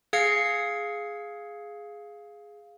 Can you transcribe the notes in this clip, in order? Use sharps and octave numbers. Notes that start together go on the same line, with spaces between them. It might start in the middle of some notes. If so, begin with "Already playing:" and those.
G#4 F5 G#6 C7 C#7